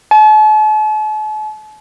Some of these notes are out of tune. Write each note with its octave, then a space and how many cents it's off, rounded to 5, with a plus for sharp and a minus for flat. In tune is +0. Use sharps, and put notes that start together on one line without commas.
A5 -45